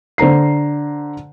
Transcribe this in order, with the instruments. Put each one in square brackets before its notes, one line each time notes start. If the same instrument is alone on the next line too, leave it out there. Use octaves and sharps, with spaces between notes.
[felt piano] D3 C5 A#5 C7